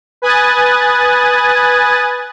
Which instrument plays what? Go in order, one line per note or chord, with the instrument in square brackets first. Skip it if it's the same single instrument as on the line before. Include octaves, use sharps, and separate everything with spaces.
[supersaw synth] B4 G#5 D#6 F#6 G#6 A6